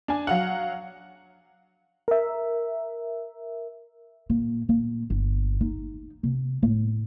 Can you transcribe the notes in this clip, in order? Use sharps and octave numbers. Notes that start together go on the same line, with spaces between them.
D4 G#5
F#3 F5 F#5
A#4 E5
A#2
A#2
G1
D#4
C3
A2